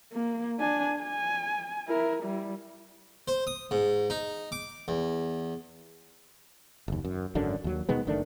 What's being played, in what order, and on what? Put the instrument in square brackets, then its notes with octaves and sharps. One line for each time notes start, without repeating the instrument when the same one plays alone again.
[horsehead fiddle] A#3
D4 G#5
G#5
E4 A#4
G3 E4
[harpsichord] C5
D#6
G#2
D#4
D6
E2
[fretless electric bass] F#1 D#2
F#2
G#1 F#2 D3 D4
D#2 F#3
B2 D#3 G#3 B3
F#1 D#3 A3 D4